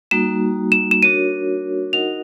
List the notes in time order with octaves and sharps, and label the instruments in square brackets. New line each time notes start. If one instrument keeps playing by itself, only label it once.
[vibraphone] G3 A#3 D#4 F#4 [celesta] E7
[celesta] E7
E7
[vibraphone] D4 F#4 A#4 C#5 [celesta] D#7
[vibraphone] D#4 F#4 A#4 D#5 F#5 [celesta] F7